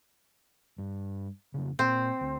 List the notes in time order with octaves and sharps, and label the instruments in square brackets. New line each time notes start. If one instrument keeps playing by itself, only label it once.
[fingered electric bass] G2
F1 C#3
[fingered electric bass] A#2 [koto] C4
[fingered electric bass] D2